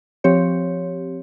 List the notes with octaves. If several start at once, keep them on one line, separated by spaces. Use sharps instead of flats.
F3 C4 G4 C#5